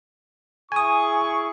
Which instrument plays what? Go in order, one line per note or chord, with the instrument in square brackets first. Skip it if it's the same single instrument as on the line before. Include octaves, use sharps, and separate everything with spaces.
[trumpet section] E4 G#4 C#6 [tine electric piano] G#5 D#6